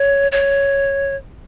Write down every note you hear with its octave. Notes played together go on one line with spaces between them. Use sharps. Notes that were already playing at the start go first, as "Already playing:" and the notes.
Already playing: C#5
C#5